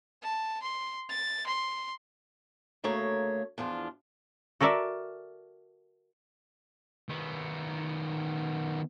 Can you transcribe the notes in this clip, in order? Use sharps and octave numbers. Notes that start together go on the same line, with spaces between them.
A5
C6
A6
C6
D2 C#3 A3 A#3 C#5 A#5
E2 F3 D4 F4
F#4 A4 A#4 D5 E5
D#3 B3